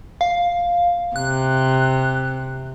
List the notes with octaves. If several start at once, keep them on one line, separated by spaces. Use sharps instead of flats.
F5
C3 F#6